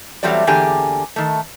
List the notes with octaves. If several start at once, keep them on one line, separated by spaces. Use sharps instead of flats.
E2 F#3 G3 A3 C4 D5
E2 D3 A#3 G4 G#4 G#5
D#3 A3